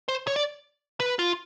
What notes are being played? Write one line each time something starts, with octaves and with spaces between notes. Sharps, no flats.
C5
C#5
D5
B4
F4